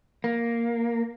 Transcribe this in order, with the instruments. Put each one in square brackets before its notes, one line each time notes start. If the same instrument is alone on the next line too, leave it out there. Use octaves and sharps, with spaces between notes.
[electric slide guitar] A#3